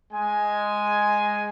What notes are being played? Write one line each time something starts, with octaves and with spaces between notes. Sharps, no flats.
G#3 G#5